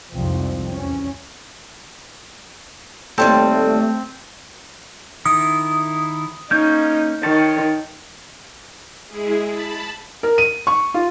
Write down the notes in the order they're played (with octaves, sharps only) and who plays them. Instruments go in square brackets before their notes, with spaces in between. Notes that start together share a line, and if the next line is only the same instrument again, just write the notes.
[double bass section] C2 F2 G#2 F3 C4
E2 C#4
[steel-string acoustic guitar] D#2 G3 A5 [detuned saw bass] A3 [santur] C4
[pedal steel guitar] D#3 E4 [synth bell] D#6
[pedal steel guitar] A#3 C#4 C#5 [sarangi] D#4 [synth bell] G6
[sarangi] D#3 [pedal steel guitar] C#5 A5
[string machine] G#3 E4 G#4
A5 B5
[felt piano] A#4
D#7
C#6
F4